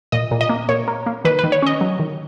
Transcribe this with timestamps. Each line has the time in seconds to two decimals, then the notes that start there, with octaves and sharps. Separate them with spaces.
0.12 A#2 D#5
0.31 A#2
0.41 D#5
0.49 A#3
0.69 A#2 C#5
0.88 A#3
1.06 A#3
1.25 D#3 B4
1.39 D#3 B4
1.52 C#5
1.62 C#4 D#5
1.81 F#3
2.00 D#3